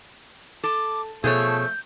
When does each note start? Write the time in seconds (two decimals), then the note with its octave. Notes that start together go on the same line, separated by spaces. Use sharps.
0.63 A4 D6
1.24 B2 F3 A3 G#4 A4 C#5 G6